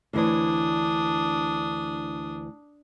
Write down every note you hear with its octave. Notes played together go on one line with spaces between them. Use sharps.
D2 E3 D4 C#5 D#6